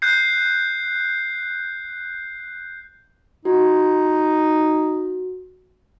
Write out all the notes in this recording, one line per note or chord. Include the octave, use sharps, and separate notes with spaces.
F#6 G6 C7
D#4 F#4